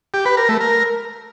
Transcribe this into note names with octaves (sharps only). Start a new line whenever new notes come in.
G4
B4
A#4
A3
A#4